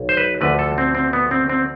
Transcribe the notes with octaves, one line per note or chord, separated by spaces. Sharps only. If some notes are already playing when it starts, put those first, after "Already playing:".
Already playing: B1
C5
B4
D2 D3 F3 A3 B4
A4
C4
C4
B3
C4
C4